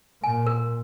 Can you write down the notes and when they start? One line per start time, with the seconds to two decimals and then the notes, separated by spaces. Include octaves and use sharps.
0.23 A#2 G#5
0.47 A#4